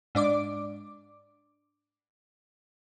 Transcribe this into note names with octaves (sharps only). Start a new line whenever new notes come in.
G#2 D4 D5 D6